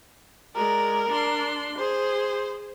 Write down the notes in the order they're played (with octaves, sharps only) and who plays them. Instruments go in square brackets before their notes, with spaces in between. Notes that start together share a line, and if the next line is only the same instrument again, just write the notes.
[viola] G#3 D5 [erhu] A#4
[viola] D4 C6
[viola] G#4 [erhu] C5